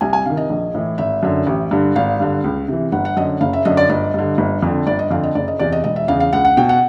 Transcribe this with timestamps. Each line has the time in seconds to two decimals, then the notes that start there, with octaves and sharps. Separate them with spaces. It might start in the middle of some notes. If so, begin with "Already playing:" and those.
0.01 C2 G#5
0.13 G#5
0.26 C3 D#3 F5
0.37 D#5
0.50 A#1
0.74 A2 E3
0.98 G#1 E5
1.23 F#2 D3
1.47 A1
1.71 G2 D3
1.96 G#1 F5
2.20 G2 D3
2.44 C#2
2.68 C3 E3
2.92 G1 F#5
3.05 F#5
3.17 F#2 D3 D#5
3.41 F#1 F5
3.53 E5
3.65 F#2 D3 D#5
3.77 D5
3.89 G1 D#5
4.14 G2 D3
4.38 G1
4.63 F2 D3
4.87 G1 D5
4.99 D#5
5.11 F2 D3 F5
5.23 D#5
5.35 F#1 D5
5.48 D#5
5.59 E2 C3 D5
5.72 D#5
5.84 E1 D#5
5.96 E5
6.08 E2 C#3 F5
6.20 F5
6.33 C#2 F#5
6.45 F#5
6.57 B2 G5
6.69 F#5